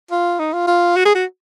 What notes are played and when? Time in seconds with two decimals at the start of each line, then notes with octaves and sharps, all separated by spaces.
0.12 F4
0.39 D#4
0.53 F4
0.67 F4
0.96 F#4
1.05 G#4
1.15 F#4